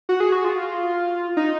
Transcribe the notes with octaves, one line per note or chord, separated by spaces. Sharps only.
F#4
G#4
F#4
F4
D#4